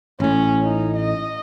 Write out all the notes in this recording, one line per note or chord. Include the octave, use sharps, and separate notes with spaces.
A1 A2 C#4
D#4
D#5